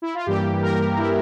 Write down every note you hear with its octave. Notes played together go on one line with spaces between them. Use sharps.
E4
F4
G2 E3 G3 A#3 G4
A#4
E4